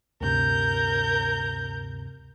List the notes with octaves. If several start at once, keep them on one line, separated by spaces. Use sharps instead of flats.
D2 G2 C3 A#4 G6